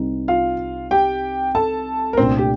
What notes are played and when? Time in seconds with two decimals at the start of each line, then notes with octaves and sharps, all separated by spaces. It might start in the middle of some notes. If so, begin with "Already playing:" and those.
Already playing: C2 C3 G3 C4 D#4
0.28 F4 F5
0.91 G4 G5
1.55 A4 A5
2.13 A#4
2.17 C2 A#2 A3 C4 D4 C5
2.38 G4